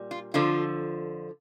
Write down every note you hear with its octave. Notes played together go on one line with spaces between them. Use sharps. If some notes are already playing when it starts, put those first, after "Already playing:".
Already playing: A#2 G3
F4
F2 D3 F3 F4